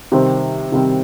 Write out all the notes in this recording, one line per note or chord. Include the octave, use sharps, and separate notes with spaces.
C3 D#3 G3 C4
C3 D#3 G3 C4